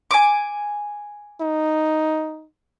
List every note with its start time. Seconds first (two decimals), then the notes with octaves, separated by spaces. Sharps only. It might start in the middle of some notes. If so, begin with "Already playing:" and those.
0.11 G#5 D6
1.41 D#4